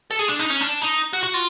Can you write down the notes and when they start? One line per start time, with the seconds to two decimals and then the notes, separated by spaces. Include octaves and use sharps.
0.11 A4
0.19 G#4
0.29 D4
0.39 D#4
0.50 C#4
0.61 D4
0.82 D#4
1.13 F#4
1.24 F#4
1.34 F4